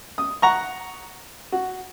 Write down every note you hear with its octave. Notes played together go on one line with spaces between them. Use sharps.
D#6
F#5 A#5 C#6
F#4